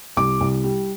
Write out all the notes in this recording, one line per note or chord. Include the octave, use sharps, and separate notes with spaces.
C2 D6
C2
G3